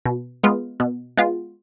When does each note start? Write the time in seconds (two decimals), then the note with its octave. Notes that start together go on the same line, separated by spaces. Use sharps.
0.05 B2
0.43 G#3 B3 F4
0.80 B2
1.17 G#3 B3 F4